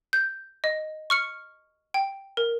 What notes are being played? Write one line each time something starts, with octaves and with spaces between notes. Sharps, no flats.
G6
D#5
C#6 F6 C#7
G5
A#4